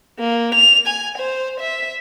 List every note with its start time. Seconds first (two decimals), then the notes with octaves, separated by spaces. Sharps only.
0.19 A#3
0.55 F7
0.87 G#5
1.18 C5
1.60 E5